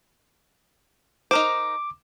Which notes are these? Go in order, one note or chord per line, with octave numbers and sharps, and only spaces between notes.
D#4 A#4 C5 D6